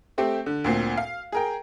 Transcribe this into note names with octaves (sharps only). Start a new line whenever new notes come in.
A3 C4 G4
D3
D2 A#2 C4 C7
F5
G#4 A#4 G5